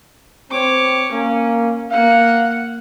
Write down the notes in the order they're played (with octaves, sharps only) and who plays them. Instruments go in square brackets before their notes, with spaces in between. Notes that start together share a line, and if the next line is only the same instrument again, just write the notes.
[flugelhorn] C4 [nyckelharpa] C#5 D6
[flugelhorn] A#3 [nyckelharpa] C#4
[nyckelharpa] A#3 F#5 [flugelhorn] F5